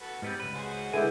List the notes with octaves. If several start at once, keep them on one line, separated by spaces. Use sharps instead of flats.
F#4 A4 B4
G#2 G3 B3 C4 D5
C#2 B4
F#4 G#4 C5
D3 G#3 E4 G4 B4 G#5